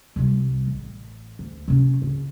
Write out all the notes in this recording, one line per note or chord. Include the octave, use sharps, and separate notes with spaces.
C2 G3
A1
D2
C3 C#4
C#2